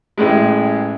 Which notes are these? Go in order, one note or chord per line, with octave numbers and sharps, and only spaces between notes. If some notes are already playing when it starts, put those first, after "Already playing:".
A1 A2 G#3